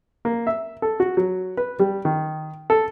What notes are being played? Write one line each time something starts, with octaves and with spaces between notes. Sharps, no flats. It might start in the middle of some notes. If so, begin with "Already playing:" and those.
A#3
E5
A4
F#4
F#3
B4
G3
D#3
A4